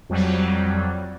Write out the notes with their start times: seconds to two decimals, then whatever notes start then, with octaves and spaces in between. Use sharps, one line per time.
0.09 F2 F#3 G3